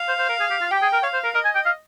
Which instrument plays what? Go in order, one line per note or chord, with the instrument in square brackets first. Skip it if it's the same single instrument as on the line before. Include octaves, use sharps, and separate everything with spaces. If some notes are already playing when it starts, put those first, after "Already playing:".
Already playing: [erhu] F5
[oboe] C5
C5
A#4
G#4
G4
F4
[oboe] G4 [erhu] G5
[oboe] G#4
A#4
[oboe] C#5 [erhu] F5
[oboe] C5
A#4
[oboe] A#4 [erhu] D#5
[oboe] G#5
G5
F5